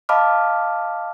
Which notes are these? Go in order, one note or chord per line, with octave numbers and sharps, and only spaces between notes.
D#5 F5 A5 B5 D6 F6